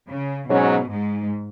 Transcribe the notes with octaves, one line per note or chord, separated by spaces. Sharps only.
C#3
G#2 B2 F#3 C#4
G#2